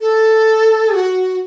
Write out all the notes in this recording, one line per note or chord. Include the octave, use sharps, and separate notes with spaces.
A4
F#4